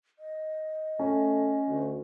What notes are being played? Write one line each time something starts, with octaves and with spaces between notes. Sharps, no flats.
D#5
A3 C#4
D2